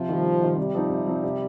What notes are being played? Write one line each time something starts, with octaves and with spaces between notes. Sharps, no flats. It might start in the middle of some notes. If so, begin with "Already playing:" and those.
Already playing: C3 F3
D#3 G3
C3
D#3 G3
C3 G3
F3 C4 D#4
C3
F3 C4 D#4
C3